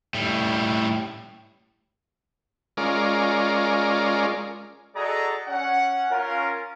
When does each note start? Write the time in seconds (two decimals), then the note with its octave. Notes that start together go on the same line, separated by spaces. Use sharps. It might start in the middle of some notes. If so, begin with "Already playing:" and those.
0.14 A2 G3
2.77 G#3 C#4 F4 A#4 D5
4.95 F#4 G#4 A4 D5 D#5 A#5
5.48 C#4 F#5
6.11 C#4 F4 A#4